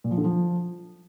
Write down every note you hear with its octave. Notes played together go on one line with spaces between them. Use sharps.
A#2
F3
D3
F3